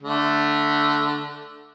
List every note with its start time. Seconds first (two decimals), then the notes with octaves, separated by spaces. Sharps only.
0.03 D3 A3